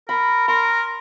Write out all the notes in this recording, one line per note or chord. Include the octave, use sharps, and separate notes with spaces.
A#4 B5
A#4 C6